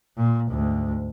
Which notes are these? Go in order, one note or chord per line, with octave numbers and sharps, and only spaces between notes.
A#2
D2 G#2